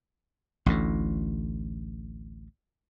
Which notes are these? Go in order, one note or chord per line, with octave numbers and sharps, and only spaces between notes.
A1 D2 A2